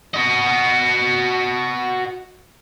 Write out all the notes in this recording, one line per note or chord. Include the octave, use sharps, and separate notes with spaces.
F#4 D#5